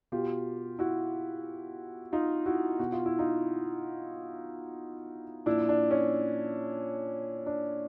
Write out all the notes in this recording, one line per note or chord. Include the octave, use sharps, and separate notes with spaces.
B2 F4 G4
E4 F#4
D#4 F4
E4 F#4
B2 F#4
F4
E4
D#4 F4
A#2 F3 D4 E4
D4
C#4
D4